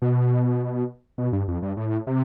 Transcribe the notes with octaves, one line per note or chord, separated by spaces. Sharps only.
B2
B2
G2
F2
G2
A2
C3